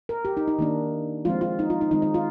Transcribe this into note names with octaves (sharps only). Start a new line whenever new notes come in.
A#4
G4
D#4
D#4
D#3 A#3 D4
F3 G#3 C4 F4
F4
D#4
F4
D#4
D#3 G#3 C4 D#4
D#4
F4